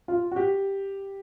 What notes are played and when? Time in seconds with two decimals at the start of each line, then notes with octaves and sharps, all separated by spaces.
0.08 F4
0.31 F#4
0.36 G4